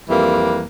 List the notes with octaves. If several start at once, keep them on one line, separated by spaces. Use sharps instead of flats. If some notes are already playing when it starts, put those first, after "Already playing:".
F2 E3 G3 A#3